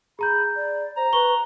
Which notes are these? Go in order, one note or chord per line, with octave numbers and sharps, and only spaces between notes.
G#4 A#5 B5 G6
D5
C5 A#5
B4 C#6 G7